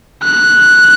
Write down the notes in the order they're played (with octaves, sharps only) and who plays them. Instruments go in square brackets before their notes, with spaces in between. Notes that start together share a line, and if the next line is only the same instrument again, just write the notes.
[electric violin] F#6